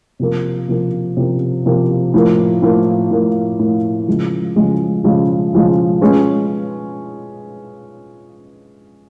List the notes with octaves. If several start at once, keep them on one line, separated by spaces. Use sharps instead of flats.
C3 F3 A#3
C3 F3 A#3
C3 F3 A#3
C3 F3 A#3
A2 F3 A#3
A2 F3 A#3
A2 F3 A#3
A2 F3 A#3
C#3 F3 G#3
C#3 F3 G#3
C#3 F3 G#3
C#3 F3 G#3
G#3 C#4 F4 G#4 B4